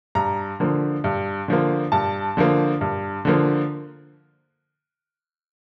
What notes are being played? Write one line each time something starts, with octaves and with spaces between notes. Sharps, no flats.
G2 A#5
D3 F3 A#3
G2
D3 F3 A#3
G2 A5
D3 F3 A#3
G2
D3 F3 A#3